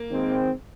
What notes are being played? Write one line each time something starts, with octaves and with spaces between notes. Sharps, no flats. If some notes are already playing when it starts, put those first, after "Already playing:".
Already playing: A#3
D#3 G#3 C4